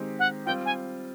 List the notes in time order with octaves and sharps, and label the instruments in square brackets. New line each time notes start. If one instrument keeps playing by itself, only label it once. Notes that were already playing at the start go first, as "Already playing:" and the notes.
Already playing: [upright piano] D#3 G#3 C4 D#4 G4
[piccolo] F#5
[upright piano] G3 C4 F4 [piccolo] G5
[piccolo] G#5